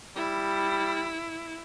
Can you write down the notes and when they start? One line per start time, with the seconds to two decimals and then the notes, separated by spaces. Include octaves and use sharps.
0.17 G3 E4